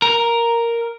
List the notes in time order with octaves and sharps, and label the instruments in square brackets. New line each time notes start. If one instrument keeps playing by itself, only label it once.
[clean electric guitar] A#4